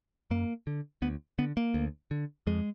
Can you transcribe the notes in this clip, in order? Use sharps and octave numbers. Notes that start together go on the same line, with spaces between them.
F#2 A#3
D3
D2 B3
D3 B3
A#3
D2
D3
F2 G#3